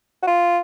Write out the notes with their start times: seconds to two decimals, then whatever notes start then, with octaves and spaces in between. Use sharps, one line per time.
0.22 F#4
0.27 F4